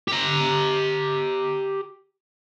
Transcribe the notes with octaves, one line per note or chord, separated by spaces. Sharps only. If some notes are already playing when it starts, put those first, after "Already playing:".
G4 A#5